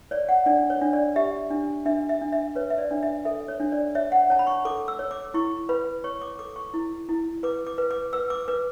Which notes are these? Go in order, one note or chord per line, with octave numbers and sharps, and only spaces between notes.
C#5 D5
F#5
D4 D5
C#5
D4
D5
G4 E5
D4
D4 E5
E5
D4
E5
B4 C#5
E5
D5
D4
E5
A4 E5
C#5
D4
D5
C#5 E5
F#5
C#5 A5
B5
C#6
A4 D6
E6
C#5
D6
E4 C#6
B4 B5
C#5 C#6
D6
A4 D6
C#6
E4
E4
B4 D6
D6
B4
D6
B4 E6
D6
B4 D6